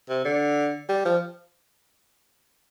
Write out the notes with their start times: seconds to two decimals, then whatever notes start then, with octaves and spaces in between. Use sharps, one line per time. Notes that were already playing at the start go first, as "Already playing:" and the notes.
0.09 C3
0.25 D3
0.89 G3
1.05 F3